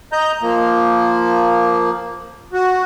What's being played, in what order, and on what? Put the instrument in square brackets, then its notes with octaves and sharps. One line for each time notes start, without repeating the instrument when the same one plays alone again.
[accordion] D#5 A#5 G6
F3 A#3
F#4